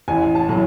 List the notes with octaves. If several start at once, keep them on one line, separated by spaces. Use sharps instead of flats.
A1 G#5
A5
A2 F#3